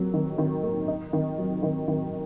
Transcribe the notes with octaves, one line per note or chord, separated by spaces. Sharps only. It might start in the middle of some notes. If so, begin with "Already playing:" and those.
Already playing: F#3 A#3
D#3
D#3
A#3
D#4
D#3
F#3
D#3
D#3